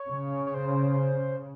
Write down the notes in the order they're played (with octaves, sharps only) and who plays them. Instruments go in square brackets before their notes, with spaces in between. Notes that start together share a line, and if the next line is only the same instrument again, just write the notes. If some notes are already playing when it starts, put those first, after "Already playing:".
Already playing: [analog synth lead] C#5
[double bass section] C#3
[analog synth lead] C#5
C5